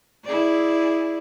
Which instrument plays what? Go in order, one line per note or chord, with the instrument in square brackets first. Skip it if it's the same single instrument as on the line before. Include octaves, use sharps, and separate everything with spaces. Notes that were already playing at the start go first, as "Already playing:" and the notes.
[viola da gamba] E4 G#4 D5